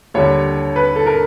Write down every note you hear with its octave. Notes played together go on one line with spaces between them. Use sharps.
D#2 D3 G3 C#5
B4
A4
A#4